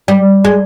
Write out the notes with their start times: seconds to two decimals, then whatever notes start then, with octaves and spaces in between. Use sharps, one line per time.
0.08 G3
0.45 G#3